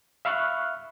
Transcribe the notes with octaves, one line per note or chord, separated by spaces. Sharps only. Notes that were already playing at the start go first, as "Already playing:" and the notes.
E5 F5 B5 C#6 F6 F#6